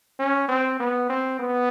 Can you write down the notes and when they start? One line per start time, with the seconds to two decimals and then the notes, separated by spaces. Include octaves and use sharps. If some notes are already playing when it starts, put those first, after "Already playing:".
0.19 C#4
0.49 C4
0.79 B3
1.10 C4
1.39 B3